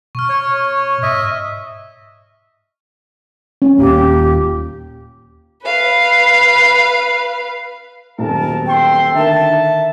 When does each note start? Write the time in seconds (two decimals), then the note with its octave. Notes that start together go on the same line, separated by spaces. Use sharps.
0.15 B2 C#6 F6
0.29 C#5
1.03 G#2 D#5 E5
3.62 C#4
3.79 D#1 A#2 G4
5.63 B4 F5
8.19 D#1 B1 A#4 A5
8.66 C4 A4 G5 C6
9.15 D3 D#3 A#4 E5 A5